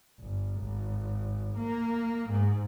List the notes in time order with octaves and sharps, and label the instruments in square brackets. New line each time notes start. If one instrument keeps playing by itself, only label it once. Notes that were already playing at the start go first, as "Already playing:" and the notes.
[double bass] G1
G#1
A#3
G#2